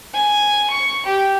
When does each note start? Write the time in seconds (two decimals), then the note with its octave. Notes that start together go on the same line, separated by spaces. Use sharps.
0.13 G#5
0.70 C#6
1.06 G4